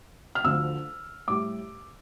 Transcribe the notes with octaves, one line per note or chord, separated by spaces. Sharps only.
F6
D2 D3 F3 E6
A2 G3 D6